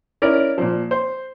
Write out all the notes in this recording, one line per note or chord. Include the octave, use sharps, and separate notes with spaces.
C#4 E4 A#4 D5
A#2 F3
C5